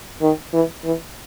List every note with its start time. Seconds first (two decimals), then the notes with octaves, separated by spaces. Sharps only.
0.22 D#3
0.53 E3
0.84 E3